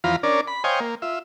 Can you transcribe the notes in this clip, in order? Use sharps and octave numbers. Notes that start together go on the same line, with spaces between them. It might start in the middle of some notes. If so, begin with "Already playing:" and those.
E2 F3 F4 F5 A#5 B5
C#4 D4 A#4 D5
B5
C5 C#5 D#5 F5 G5 G#5
A#3
F4 E5